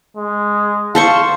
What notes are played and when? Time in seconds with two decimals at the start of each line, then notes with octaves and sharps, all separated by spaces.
0.17 G#3
0.95 A4 C5 F5 C#6